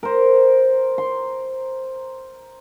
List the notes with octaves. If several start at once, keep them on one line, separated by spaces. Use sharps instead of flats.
A#4 C5
C6